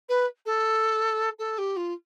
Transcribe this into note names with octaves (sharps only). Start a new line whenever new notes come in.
B4
A4
A4
G4
F4